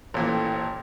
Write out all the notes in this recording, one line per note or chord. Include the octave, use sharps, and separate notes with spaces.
A1 A#2 E3 A4 C5 G5